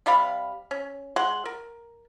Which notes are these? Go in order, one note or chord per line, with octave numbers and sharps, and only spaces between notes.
C3 G3 F5 B5
C#4
G#3 F#5 C6
A#4